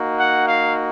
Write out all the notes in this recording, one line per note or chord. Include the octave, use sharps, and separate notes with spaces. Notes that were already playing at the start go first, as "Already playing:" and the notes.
Already playing: A#3 D#4 F#4
F#5
F5